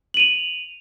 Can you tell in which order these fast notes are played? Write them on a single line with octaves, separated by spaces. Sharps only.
F#7 D#7 F7